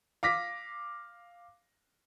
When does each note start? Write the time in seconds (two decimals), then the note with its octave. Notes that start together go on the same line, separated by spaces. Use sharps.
0.23 F5 D6 A#6 B6